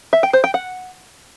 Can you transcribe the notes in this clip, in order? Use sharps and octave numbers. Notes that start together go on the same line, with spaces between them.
E5
G5
C5
G5
F#5